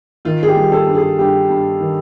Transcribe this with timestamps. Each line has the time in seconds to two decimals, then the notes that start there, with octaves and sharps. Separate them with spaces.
0.25 D#3 F4
0.43 G#4
0.48 G4
0.56 G3
0.72 A4
0.87 G2
0.95 G#4
1.19 G2 G4
1.50 G2
1.80 D#3